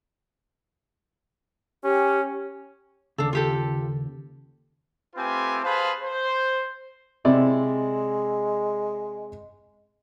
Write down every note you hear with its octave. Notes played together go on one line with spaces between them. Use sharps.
C#4 G4
D#2 C#3 D4 A4
F4 G4 A4
A3 C4 F4 G4 B4 G#5
G#4 B4 C5 F5 A5 B5
C5
C3 G#3 E4 D5